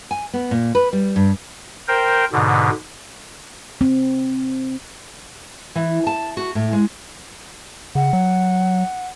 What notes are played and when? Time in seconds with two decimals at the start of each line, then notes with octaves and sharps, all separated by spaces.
0.11 G#5
0.34 B3
0.51 A#2
0.75 B4
0.93 G3
1.16 G2
1.88 A#4 C5 G5
2.32 G#2 B2 D3
3.81 C4
5.75 E3
6.07 A5
6.37 F#4
6.55 A2
6.73 G#3
7.95 C#3 F#5
8.13 F#3